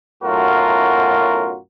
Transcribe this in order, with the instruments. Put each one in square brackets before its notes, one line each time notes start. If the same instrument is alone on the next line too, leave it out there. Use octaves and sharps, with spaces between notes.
[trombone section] B1 F#2 A2 F4 F#4 A#4